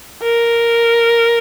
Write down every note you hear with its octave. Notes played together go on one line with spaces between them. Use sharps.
A#4